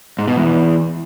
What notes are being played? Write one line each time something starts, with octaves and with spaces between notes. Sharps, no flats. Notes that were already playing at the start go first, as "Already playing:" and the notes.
G#2
B2
E2